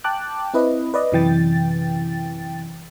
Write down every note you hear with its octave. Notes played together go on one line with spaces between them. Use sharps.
G5 A5 D6 F#6
C4 E4 B4 D#5
B4 D5 D#5
F#2 C3 E3 G5 A6